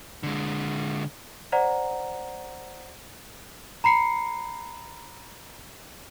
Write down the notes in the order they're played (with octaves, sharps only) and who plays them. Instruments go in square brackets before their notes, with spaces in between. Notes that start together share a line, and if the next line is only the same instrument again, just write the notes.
[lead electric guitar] D3 G#3
[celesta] C5 D5 F#5 A#5
A#5 B5 C7 C#7